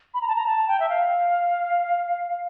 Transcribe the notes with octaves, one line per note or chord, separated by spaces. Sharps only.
B5
A#5
A5
A#5
A5
G5
E5
F5